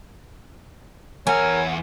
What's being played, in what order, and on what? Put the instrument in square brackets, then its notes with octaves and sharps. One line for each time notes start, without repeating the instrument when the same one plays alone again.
[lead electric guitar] E2 F#5 [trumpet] A#4 [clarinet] C#5 [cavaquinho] G#5